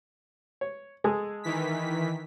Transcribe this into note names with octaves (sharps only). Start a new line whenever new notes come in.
C#5
G#3 G#4 A4
D#3 E3 B6